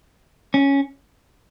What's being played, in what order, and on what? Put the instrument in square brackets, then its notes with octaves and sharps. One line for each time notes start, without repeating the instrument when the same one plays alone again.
[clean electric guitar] C#4